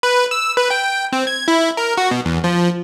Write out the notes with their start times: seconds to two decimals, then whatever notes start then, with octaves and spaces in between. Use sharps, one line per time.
0.03 B4
0.31 E6
0.57 B4
0.70 G5
1.12 C4
1.27 G#6
1.48 E4
1.77 A#4
1.97 F#4
2.11 B2
2.25 E2
2.44 F3